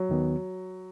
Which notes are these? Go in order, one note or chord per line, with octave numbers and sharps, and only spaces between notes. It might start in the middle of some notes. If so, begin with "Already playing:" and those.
Already playing: F#3
D#2 D#3 B3